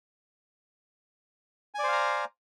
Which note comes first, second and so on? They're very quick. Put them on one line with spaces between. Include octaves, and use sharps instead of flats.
G#5 D5 C5 F5 A#5